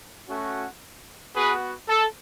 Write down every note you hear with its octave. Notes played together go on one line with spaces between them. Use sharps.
A3 C#4 F#4
B3 F#4 G#4 B4
A4